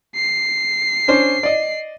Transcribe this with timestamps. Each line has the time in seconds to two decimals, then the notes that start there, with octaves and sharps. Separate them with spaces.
0.16 C7
1.08 C#4 D4 C5
1.43 D5 D#5